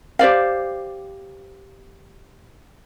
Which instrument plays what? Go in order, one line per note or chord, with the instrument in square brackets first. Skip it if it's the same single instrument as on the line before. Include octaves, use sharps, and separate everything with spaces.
[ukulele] G4 C5 D5 F5